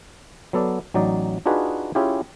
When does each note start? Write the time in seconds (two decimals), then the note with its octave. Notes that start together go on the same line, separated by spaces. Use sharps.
0.53 F#3 B3 A4 D5
0.94 A1 F#3 D#4 D5
1.46 D4 D#4 F4 F#4 G#4 B4
1.95 C#4 E4 F4 G4 G#4